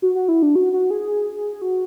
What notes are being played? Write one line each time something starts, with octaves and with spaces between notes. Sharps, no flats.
F#4
F#4
E4
D4
F#4
F#4
G#4
F#4